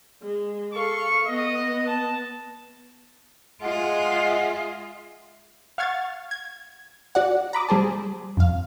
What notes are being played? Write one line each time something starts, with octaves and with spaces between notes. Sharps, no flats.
G#3
A4 F5 C#6
B3 D#5
A5
G#3 F4 G#4 D#5 E5 F#5
F5 F#5 C#6 F6 G#6 A6
G#6
F#4 D5 F#5
A#5 B5 D6 D#6
G3 G#4 C5 A5
F2 F5